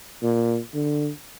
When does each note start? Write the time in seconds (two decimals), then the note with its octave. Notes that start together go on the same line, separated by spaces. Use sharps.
0.23 A#2
0.74 D3